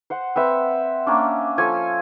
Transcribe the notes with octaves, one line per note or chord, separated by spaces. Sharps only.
C5 F#5
C4 B4 E5
A#3 C#4 D4
F3 C#4 A4 G#5